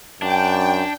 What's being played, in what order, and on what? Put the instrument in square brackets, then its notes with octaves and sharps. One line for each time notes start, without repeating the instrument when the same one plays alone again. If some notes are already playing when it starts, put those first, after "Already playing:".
[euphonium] F#2 [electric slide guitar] D4 [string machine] G5